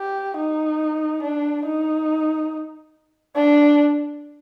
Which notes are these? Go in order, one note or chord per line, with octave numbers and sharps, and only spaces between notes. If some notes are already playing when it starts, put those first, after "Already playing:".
Already playing: G4
D#4
D4
D#4
D4